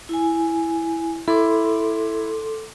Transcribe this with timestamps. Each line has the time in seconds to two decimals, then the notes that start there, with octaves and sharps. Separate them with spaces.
0.09 E4 G#5
1.28 E4 A4 C6 D6